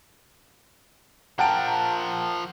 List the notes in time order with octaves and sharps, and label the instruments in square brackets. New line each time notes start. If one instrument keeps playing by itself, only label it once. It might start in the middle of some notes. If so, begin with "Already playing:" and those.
[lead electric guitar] F3 A#4 [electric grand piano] F#5 A5 D7 [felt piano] G5 A#5